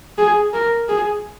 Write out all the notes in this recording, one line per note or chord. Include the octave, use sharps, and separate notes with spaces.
G#4
A#4
G#4